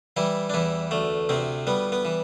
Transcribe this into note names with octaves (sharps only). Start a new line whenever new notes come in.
E3 G3 E4
D4
E2 E3 E4
D2 A3
D2 C3 C4
G3 B3
B3
E3